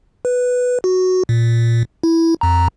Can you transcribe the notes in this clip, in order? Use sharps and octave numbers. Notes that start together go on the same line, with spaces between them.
B4
F#4
A#2
E4
F2 A#5